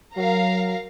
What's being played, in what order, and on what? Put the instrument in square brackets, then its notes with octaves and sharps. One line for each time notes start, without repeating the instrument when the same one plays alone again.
[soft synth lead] F#3 [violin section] A#4 F5 A#5